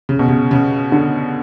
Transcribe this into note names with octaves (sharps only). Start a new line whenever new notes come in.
C#3
B2
C#3
C#3
D3